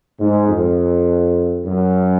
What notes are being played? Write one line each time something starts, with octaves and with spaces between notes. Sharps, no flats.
G#2
F2
F#2